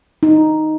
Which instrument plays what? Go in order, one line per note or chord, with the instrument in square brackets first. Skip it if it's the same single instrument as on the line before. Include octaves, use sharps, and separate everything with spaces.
[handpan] D#4